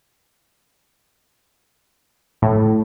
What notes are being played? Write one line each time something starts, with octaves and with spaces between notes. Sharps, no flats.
A2